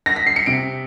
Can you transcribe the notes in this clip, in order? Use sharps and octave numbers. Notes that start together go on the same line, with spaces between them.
A#6
B6
C7
C#7
C3 D7